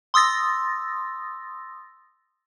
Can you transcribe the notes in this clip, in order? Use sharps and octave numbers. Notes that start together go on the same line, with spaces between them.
C6 D#6 E6 A6 A#6